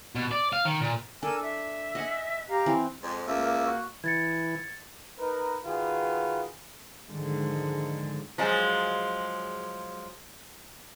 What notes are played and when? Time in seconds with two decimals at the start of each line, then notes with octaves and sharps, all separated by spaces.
0.15 B2
0.31 D5
0.53 F5
0.65 D#3
0.82 A#2
1.23 D4 A4 A#4 G#5 E6
1.41 E5
1.95 D#5 F#5 G#5
2.49 G4 F5 A#5
2.66 E3 C4
3.03 F2 G#3
3.28 C#2 A#3 E5
3.41 A#3
3.67 F#4
4.04 E3 G#6 A6 C#7
5.18 D#4 A#4 B4
5.65 D#3 F4 F#4 G#4 B4
7.08 G#2 D3 D#3 F3 G#3
8.38 F3 F#3 G#3